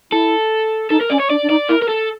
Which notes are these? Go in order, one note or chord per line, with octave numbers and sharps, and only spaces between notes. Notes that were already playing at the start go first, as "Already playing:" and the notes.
E4 A4
D#4 A4
A#4
C#4 D5
C#5
D4 D5
D4
D#4 D5
E4 A#4
A#4
A4